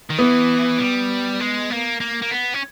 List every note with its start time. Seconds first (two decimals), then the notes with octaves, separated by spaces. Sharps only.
0.10 D#3
0.18 E3 B3
0.79 G3
1.40 G#3
1.70 A#3
2.00 A#3
2.22 A#3
2.31 B3
2.54 C#4